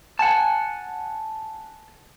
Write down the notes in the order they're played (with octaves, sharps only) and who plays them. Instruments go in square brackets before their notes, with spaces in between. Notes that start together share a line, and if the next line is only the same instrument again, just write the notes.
[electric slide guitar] F#5 G#5 A5